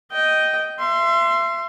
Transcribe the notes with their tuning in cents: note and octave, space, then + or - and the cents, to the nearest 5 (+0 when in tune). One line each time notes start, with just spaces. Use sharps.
D#5 +0 G5 -10
E5 +35 C6 +0